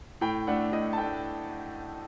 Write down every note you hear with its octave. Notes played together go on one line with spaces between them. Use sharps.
A2 G5
A3 D4 F#5
A2 D#5
A5
A3 D4 G5